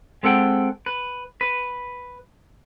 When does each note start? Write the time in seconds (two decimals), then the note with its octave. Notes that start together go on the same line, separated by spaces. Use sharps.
0.23 G#3 C4 A4 F#5 G5
0.86 B4
1.41 B4